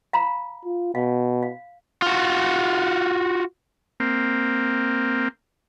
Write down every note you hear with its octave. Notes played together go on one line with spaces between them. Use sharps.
F5 A#5 B5
F4
B2 F5
F5
F4 F#4
A#3 C4